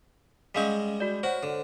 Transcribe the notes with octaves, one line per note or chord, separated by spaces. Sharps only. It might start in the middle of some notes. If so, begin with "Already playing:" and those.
G3 G#3 C#4 F5 C#6 B6
F#4 D5
F#4 C5 C#5 F#5
D3